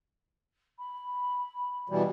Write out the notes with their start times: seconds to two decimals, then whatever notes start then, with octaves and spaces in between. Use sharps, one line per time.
0.79 B5
1.89 B2 E3 G3